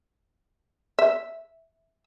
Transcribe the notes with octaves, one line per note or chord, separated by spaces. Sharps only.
E5